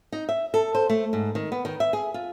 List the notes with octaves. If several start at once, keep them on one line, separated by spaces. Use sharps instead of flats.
D#4
E5
A4
C5
A3
G#2
D#3
B3
D#3
E5
G#4
F4